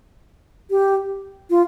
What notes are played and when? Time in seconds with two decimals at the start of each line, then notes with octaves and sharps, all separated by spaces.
0.71 G4
1.50 F4